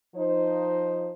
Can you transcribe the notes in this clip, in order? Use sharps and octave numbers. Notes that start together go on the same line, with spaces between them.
F3 D#4 C5